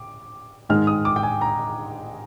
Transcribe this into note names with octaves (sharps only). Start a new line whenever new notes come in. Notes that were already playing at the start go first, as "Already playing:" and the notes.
Already playing: D6
G#2 D#3 G#3 F6
D#6
D6
G5
G#5
A#5